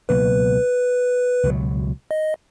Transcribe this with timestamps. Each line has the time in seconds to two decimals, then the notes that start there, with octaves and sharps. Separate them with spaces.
0.09 C#2 B2 F#3 A#3 B4
1.44 C#2 B2 F#3
2.11 D#5